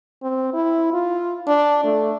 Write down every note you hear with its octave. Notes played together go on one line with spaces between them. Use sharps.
C4
E4
F4
D4
A3